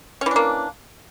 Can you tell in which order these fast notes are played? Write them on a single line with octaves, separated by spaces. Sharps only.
C#4 E3 D4 A#3